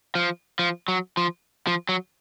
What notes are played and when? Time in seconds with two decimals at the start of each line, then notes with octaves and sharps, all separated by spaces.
0.15 F3
0.59 F3
0.88 F#3
1.17 F3
1.67 F3
1.89 F#3